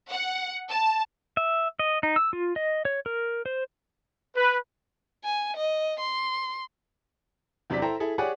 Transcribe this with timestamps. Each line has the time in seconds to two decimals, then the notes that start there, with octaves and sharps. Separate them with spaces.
0.10 F#5
0.71 A5
1.37 E5
1.79 D#5
2.03 D#4
2.16 E6
2.33 F4
2.56 D#5
2.85 C#5
3.06 A#4
3.46 C5
4.37 B4
5.24 G#5
5.57 D#5
6.00 C6
7.70 E2 C3 F#3 D4 D5 B6
7.82 E4 A4 C5 G5 A#5
8.00 E4 G#4 A4
8.18 G4 G#4 C#5 D5 F#5 G#5